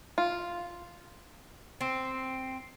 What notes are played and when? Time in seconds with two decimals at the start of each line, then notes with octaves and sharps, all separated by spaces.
0.18 F4
1.81 C4